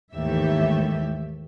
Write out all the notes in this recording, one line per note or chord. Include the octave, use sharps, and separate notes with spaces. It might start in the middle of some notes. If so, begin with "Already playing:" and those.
D#2 G#2 E3 A3 G4 E5